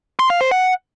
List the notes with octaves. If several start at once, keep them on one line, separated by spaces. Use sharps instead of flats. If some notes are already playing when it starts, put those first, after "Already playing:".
C6
F5
C5
F#5